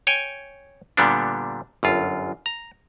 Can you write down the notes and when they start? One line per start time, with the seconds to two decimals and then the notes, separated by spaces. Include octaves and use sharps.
0.07 C#5 G5 G#5
0.97 A#2 D3 G3 B3 D4
1.83 G1 F#2 F4
2.46 A#5